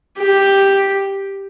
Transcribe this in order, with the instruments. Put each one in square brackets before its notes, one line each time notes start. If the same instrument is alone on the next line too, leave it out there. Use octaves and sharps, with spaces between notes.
[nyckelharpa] G4